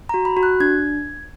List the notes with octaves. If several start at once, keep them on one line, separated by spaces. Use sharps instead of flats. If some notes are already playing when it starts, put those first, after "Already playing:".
A#5
F#4
B5
F#4
F#6
D4 G#6